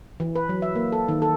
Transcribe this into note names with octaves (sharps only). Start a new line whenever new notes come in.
E3
B4
F#3
E5
A#3
A4
D#3
A4